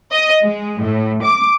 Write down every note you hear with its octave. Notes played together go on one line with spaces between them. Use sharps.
D#5
G#3
A2
D6